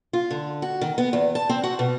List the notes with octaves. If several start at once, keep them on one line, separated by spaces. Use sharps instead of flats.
F4
D3
F#4
D#3
B3
E2
A5
C4
F#4
B2